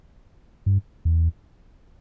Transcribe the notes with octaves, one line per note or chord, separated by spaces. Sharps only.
G2
E2